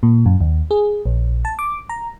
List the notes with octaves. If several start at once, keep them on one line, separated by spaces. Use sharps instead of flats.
A#2
F#2
D#2
G#4
A#1
A5
D6
A#5